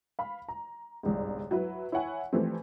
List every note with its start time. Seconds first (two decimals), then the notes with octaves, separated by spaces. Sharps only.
0.19 F5 B5
0.49 A#5
1.03 G1 C2 G#2
1.51 F#3 E4 B4
1.92 E4 C#5 F#5 G#5
2.33 E3 F3 G3 A3 C4